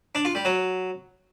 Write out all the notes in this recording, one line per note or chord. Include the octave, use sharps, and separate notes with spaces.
D4
F4
G3
F#3